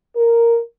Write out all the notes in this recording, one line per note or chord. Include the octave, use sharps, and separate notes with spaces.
A#4